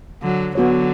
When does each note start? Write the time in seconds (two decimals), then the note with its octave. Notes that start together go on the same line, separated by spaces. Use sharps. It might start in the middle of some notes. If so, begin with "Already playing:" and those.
0.22 D3 F#3
0.55 D3 F#3 B3 F#4 C#5